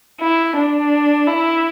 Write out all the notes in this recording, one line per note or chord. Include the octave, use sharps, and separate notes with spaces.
E4
D4
E4